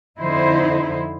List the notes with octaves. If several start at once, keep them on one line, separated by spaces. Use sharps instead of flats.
F2 D3 D#4 E4 C5